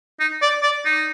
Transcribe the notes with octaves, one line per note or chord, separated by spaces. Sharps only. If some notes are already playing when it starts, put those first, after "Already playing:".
D#4
D5
D5
D#4